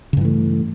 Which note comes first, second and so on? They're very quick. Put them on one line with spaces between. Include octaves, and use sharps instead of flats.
C#3 G2 E3 A3